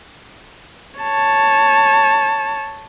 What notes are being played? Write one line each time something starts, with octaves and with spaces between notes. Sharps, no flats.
C#5 A5